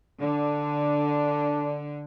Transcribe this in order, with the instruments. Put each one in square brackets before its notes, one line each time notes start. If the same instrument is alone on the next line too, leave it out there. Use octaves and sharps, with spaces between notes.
[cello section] D3 [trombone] D4